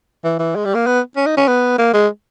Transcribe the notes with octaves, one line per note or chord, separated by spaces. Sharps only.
E3
E3
G#3
G3
A#3
B3
C#4
D#4
C#4
B3
A#3
G#3